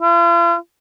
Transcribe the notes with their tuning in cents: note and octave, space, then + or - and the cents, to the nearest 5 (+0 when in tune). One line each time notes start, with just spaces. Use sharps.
F4 -45